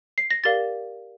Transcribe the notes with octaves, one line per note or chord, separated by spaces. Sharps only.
C7
A#6
G4 A#4 D5 F5 A6